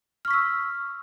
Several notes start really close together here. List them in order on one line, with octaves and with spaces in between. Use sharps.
F6 C#6 B6 E6